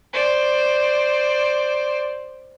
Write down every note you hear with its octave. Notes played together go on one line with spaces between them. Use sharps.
C5 D5